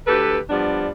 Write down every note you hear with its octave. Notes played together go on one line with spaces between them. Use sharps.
D2 G4 A4 B4
F3 G3 B3 D4 D5